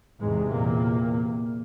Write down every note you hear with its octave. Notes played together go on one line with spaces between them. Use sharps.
E2 G#2 C3 G#3
A#2 A#3